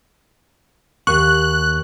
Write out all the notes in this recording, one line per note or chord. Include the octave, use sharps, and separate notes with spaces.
D#2 C#6 F#6